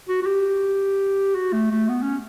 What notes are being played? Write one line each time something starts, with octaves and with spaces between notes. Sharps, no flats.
F#4
F#4
G4
F#4
A3
A3
B3
C#4